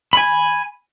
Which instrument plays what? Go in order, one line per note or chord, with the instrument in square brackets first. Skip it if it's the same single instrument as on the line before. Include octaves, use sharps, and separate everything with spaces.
[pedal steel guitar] G#5 B5